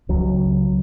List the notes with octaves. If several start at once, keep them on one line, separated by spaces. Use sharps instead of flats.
C#2 C#3 F#3